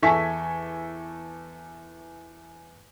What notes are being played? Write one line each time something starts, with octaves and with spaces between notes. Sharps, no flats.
E2 A4 E5 G#5 C#6 B6